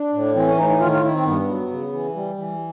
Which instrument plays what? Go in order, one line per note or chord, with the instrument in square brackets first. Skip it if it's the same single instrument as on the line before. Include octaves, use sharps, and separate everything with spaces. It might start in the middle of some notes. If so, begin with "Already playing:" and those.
Already playing: [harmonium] D4
A2
E3 C4
C#4
A2 D#4
D#4
D#3 F4
F4
D#3 E4
C4
G2 B3
F#3
C#3
E3
G3
E3